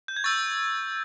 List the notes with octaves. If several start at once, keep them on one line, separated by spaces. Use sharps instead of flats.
G6
G#6
C#6 E6 G6 A6